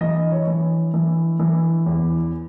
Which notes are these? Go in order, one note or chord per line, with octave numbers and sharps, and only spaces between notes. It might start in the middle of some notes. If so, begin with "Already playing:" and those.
E3 D#5
C#5
E3
E3
E3
E2